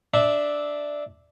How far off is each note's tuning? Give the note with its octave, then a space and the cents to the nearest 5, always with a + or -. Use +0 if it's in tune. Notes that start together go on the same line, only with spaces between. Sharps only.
D4 +0 E5 -10